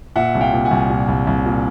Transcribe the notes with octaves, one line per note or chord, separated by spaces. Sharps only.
A#2 E5 F#5
C2
F5 G5
A#2
F#5 G#5
C2
A#2
C2
C2
A#2